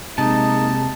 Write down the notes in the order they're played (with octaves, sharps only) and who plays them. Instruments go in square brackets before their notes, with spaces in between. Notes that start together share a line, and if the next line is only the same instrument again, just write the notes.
[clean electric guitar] C3 [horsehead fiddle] G#3 A#3 [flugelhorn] D#4 [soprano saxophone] A5